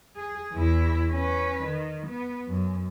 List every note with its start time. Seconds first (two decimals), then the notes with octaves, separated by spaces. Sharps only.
0.16 G#4
0.54 E2 E4
1.12 C#4 B4
1.64 D#3
2.07 B3
2.48 F#2